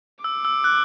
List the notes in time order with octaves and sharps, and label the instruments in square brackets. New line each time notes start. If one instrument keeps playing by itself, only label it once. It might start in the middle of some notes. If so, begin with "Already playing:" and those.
[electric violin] D6 [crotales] E6
[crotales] E6
F#6